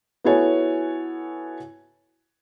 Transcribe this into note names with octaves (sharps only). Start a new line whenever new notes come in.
B3 E4 F#4 A4 C#5 G#5